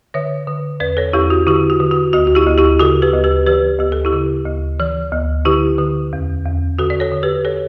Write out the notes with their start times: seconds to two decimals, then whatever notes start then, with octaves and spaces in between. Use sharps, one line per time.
0.14 D3 C#5 E5
0.47 D3
0.80 E2 B4 D5
0.97 A4 C#5
1.13 E2 E4 G4
1.30 F#4
1.47 D3 E4 G4
1.70 F#4
1.80 D3
1.91 F#4
2.13 D2 F#4
2.27 F#4
2.35 E4 G4
2.47 D2
2.58 E4 G4
2.79 C#3 F#4 A4
3.02 G4 B4
3.14 D2
3.24 G4 B4
3.46 E3 G4 B4
3.79 D2 G4
3.92 A4
4.05 E4 G4
4.13 C#3
4.46 D2
4.80 E3
5.12 D2
5.45 D3 E4 G4
5.78 D3
6.13 E2
6.46 E2
6.79 D3 F#4 A4
6.90 D5
7.00 A4 C#5
7.12 D3
7.23 G4 B4
7.45 A4 C#5